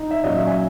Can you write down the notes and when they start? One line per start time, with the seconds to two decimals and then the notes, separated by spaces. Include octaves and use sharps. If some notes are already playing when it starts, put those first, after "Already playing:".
Already playing: D#4
0.11 E5
0.24 A#2 F#3 C#4 D#5
0.35 E5
0.47 E5 G#5